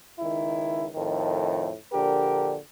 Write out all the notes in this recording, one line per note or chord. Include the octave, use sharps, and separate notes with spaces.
C#2 D#3 E4
F2 A2 D#3
A#1 D3 G4 A#4